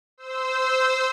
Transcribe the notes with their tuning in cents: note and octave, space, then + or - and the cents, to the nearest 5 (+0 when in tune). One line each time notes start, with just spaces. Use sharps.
C5 -15 E6 -15